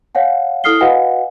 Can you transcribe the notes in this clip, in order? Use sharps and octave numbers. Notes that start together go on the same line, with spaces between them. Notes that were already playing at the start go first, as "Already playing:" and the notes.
C#5 F5 F#5 G#5
E4 A4 D#6 F6 C7 G7
F#4 B4 D#5 F5 F#5 G#5